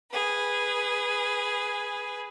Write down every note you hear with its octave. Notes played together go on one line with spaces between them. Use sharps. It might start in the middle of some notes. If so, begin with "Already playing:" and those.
G#4 B4